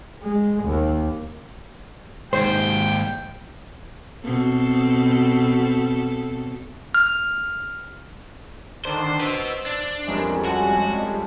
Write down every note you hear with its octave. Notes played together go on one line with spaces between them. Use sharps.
G#3
D#2
D#2 G#2 C5 G5
B2 C4 A4
F6
D3 D#3 D4 C5
B4 C5 D#5 E6
D4
F2 E3 G3 G#3 C#4 A#4
F#4 A4 D#5 G#5